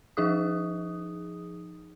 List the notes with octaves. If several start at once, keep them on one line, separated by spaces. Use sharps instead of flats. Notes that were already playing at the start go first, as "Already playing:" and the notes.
F3 D#4 G#4 D#6